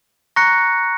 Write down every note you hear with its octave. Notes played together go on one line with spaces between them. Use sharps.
A#5 C#6 F#6 A#6 C#7